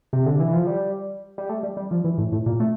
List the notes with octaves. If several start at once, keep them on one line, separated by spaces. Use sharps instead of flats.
C3
D3
E3
F3
G3
G3
A3
G3
G3
F3
E3
A2
A2
A#2
A3